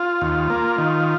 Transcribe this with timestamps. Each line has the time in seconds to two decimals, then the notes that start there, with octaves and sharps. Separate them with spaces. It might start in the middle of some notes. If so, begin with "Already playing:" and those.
Already playing: F4
0.21 D#2
0.50 A#3
0.78 D#3